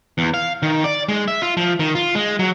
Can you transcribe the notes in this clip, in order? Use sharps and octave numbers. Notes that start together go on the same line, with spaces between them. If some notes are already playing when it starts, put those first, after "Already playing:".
E2
F5
D#3
D5
G#3
E5
F4
F3
D#3
F4
G#3
F#3